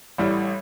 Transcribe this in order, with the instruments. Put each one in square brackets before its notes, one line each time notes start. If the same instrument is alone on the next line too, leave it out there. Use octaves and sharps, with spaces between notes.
[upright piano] A1 A2 G3